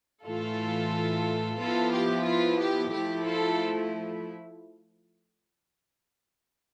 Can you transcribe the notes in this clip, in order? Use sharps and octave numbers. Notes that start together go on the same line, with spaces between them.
A2 E3 A3 F4 A4
F3 B3 E4 F4 A4
G4
F4
G4
F3 A3 E4 G4
F4 A4